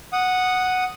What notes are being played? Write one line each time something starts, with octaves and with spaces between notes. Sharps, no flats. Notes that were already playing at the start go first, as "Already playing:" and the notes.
F#5 D#6